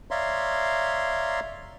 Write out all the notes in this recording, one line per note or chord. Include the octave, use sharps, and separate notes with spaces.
C#5 D5 E5 F5 A#5 C6